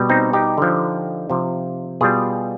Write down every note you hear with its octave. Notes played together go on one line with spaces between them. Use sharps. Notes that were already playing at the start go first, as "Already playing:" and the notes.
Already playing: B2 G3
C4 D#4
D#4 G4
D3 F3
C3 F3
B2 G3 F4 G#4